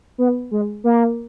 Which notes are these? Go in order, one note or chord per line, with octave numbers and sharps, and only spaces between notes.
B3
G#3
A#3